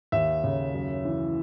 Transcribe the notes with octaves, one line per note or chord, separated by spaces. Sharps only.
D#2 E5
C#3
F#2
E3